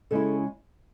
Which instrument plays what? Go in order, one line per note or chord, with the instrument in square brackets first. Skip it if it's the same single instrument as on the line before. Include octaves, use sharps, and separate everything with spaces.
[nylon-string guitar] C#3 G#3 C#4 E4 A4